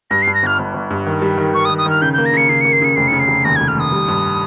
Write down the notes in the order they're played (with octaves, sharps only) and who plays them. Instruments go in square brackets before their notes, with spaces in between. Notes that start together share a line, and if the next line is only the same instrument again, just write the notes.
[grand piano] G2 [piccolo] A#6
[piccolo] C7
[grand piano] G2
[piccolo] A#6
[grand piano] G1 [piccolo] F6
[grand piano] G1
G1
G2
D#3
G3
D#3
[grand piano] D#3 [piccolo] C#6
[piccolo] D#6
[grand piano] D#3
[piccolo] D#6
[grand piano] D#3 [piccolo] F6
[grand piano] C#3 [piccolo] G6
[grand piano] A#3 [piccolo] G6
[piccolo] A#6
[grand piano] C#3 [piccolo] C#7
[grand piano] C#3 [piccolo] C7
[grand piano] A#3 [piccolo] C#7
[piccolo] C7
[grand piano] C#3 [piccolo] C#7
[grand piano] F1 [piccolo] C7
[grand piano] C#3 [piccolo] C#7
[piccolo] C7
[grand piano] F1
[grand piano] D#2 [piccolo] A#6
[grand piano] F1 [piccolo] G#6
[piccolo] F6
[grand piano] D#2 [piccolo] D#6
[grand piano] G3
G2